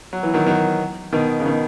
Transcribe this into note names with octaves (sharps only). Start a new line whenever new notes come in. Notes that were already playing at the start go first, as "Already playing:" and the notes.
F#3
E3
D#3 F#3
D#3 F#3
B2 D#3
C#3
B2 D#3